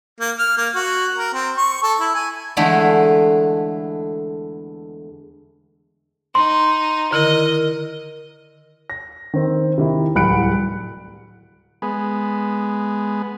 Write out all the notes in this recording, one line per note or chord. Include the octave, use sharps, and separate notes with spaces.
A#3
F6
A#3
F#4
A#4
C4
C#6
A4
E4
G#5
E2 D3 G#3 A3 E4
D#4 C6
D3 D#3 E4 A#4 D#5
A#6
D#3 C4
C3 D#3 E4
D1 C2 B5 F#6 C#7 D7
G#3 B3